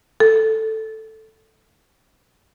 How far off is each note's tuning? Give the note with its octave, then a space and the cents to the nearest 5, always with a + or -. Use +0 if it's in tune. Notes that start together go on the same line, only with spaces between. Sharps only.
A4 +5